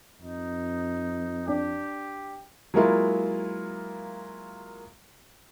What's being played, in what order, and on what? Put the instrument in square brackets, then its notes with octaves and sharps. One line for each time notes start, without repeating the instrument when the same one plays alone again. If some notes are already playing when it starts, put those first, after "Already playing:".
[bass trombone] F2 [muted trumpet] D#4
[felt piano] D4 [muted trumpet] G4
[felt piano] F#3 G#3 A#3 E4 F4